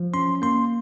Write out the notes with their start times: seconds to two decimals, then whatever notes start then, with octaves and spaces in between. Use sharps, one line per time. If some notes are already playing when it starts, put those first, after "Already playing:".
Already playing: F3
0.14 C#4 C6
0.42 A#3 C6